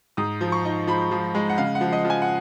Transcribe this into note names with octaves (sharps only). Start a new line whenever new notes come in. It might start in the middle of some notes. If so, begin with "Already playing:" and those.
G#2 D#6
F3
C#6
D#4
F3 B5
F3
G#3
F#5
C#3 F5
F#5
F3
D#5
F3
G#5
F#5